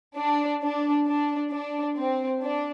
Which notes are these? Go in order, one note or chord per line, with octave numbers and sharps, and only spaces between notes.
D4
D4
D4
D4
C4
D4